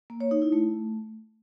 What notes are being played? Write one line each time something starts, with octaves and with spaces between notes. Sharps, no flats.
A#3
C#5
D#4
E4
A3